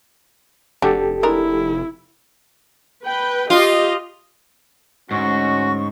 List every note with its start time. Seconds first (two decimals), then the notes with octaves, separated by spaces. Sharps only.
0.82 F1 D4 F#4 G4 A4
1.23 G#3 D4 E4 A#4
3.05 B4 G5
3.50 F4 G4 D#5
5.11 D2 G#2 C#4 F#4 C#6